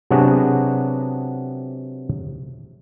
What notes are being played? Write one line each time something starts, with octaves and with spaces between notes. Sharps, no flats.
C3 F#3 B3 D4 F#4 G#4